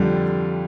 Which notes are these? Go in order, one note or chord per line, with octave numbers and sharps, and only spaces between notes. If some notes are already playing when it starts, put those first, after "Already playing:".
Already playing: F2 D3 G3